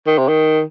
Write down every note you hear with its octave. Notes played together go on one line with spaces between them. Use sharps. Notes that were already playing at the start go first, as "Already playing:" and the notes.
D#3
C3
D#3